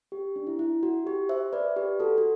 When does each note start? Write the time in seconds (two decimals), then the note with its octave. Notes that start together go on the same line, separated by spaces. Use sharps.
0.12 G4
0.36 D4
0.47 E4
0.59 E4
0.83 F#4
1.07 G4
1.29 C5 E5
1.53 B4 D5
1.76 G4 B4
2.00 F#4 A4
2.18 F#4